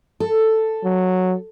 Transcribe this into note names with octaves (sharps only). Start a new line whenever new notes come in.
A4
F#3